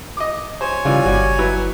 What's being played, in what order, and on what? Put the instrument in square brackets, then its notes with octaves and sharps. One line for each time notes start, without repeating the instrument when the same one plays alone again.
[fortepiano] D#5 D6
[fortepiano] C5 [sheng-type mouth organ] C#5 G#5
[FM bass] C#3 [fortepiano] E3 G3 F4
[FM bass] G1 [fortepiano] G3 F#4
[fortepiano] F#3 E4 B4